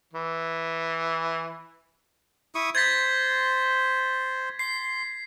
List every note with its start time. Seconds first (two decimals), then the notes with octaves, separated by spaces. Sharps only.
0.13 E3
2.55 E4 C#6 D#6
2.75 C5 C6 G#6 A6 B6
4.59 C6 C7